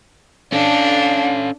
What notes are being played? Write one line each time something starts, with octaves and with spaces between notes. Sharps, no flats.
C#4 D4 A4 F5